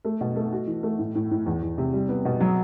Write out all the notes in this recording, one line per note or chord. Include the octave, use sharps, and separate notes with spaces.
A3
B2
A3
F#4
E3
A3
A2
A2
A2
E2
E2
C3
G3
B3
B2
F#3